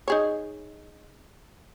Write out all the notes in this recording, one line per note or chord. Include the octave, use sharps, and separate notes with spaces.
D#4 G#4 C#5